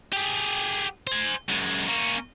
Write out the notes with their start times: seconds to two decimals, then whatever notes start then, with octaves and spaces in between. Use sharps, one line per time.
0.13 G4 G#4
1.07 C5 G#5
1.49 F#2 G#3
1.87 A#3 C#4